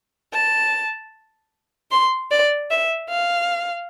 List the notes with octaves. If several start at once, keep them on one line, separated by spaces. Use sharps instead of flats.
A5
C6
D5
E5
F5